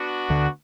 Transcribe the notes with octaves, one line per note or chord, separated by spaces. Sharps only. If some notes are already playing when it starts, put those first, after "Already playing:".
Already playing: B3 D4 F#4
D2 D3